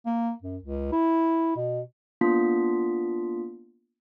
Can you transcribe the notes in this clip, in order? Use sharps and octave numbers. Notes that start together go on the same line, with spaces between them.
A#3
F#2
C#2
E4
B2
A#3 B3 D4 F4 D#6 B6